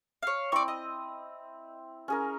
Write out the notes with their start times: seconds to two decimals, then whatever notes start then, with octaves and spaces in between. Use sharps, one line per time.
0.23 C#5 F5
0.52 C4 E4 D5 C#6
0.68 D#5
2.08 C#4 G#4 A#4